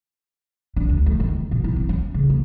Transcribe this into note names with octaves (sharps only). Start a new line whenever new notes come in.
D4
D2
A3
D#3
D#2
B2
E4
C4
C#4
C#3
A#3